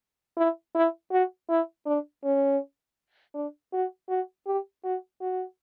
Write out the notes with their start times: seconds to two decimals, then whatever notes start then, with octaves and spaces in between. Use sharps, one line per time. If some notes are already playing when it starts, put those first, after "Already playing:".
0.37 E4
0.75 E4
1.11 F#4
1.49 E4
1.86 D4
2.24 C#4
3.35 D4
3.73 F#4
4.09 F#4
4.47 G4
4.84 F#4
5.21 F#4